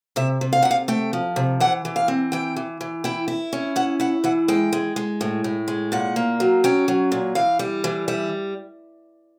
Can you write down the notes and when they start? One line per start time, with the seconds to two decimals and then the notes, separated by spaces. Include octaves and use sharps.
0.16 C3 E5
0.41 C3
0.53 F5
0.62 C3 F#5
0.71 F5
0.88 A3 G5
1.13 F3
1.36 C3
1.60 E3 F#5
1.85 E3
1.96 F5
2.08 C4
2.32 E3 G5
2.56 E3
2.81 E3
3.04 E4 G5
3.28 E4
3.53 C#4
3.76 E4 F#5
4.00 E4 F#5
4.24 E3 F#5
4.48 G#3 G5
4.73 G#3
4.96 G#3
5.21 A2
5.44 A2
5.68 G#3
5.92 A#2 F#5
6.16 A#3
6.40 F#3
6.64 C#4 G5
6.88 F#3
7.12 A#2
7.35 E3 F5
7.59 G3
7.84 E3
8.08 G3 E5